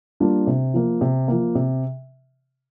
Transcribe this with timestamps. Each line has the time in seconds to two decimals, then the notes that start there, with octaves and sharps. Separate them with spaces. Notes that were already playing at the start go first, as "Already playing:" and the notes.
0.20 G3 A#3 D4 F4
0.47 C3
0.74 F3 A#3
1.01 C3
1.28 F3 A#3
1.55 C3